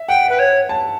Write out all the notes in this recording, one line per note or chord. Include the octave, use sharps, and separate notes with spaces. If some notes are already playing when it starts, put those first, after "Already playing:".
Already playing: E5
F#5 G5
B4
C#5
A5